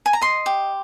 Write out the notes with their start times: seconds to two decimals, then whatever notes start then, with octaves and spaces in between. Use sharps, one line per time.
0.06 G#5
0.13 A#5
0.21 D#5 C6
0.46 G4